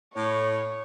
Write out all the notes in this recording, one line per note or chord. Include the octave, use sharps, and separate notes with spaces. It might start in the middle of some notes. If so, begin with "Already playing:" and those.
A2 C#5